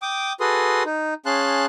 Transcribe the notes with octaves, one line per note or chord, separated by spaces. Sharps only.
G5 D6 D#6
F#4 G#4 A4 B4 C6 D#6
D#4
C#4 G#4 F5 A5 C6 F#6